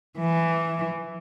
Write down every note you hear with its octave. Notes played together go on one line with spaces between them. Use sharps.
E3